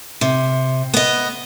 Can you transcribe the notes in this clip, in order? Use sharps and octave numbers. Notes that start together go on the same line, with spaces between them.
C3
B3 D#5